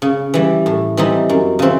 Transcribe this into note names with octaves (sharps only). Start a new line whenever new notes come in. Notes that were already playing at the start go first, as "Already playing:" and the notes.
C#3
E3 G3
A2
E3 G3 C4 D#4
F#2
C#3 E3 C4